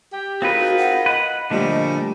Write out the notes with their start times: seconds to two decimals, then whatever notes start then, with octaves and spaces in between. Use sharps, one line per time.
0.11 G4
0.42 C4 D#4 F4 F#4 G#4 A#4 B4
0.78 F#5
1.06 B4 D#5 F#5
1.50 A#2 D3 F3 G3 A3 D#5